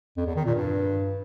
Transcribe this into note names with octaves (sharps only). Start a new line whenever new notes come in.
F2
E2
D#3
A#2
G2